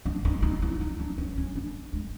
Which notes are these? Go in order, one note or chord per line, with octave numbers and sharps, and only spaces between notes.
D4
D#4
D#4
E4
D#4
D4
C#4
C#4
D4
G#3